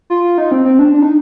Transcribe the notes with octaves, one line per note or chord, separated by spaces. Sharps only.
F4
D#4
C4
C4
D4
D4
D#4